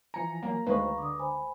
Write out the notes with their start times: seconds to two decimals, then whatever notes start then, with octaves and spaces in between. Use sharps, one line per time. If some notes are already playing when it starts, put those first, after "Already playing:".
0.14 E3 F3 G#5 A#5 C#7
0.43 F#3 A#3
0.67 D2 D#3 G#3 A3 B4 C5 F5 C#6
0.98 D3 D6 D#6
1.19 C5 G#5 B5